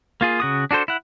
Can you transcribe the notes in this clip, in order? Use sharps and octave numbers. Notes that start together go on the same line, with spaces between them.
A#3 F4 G#4
C#3 F#4 D#6
D4 F#4 A4 C5
E4 F#5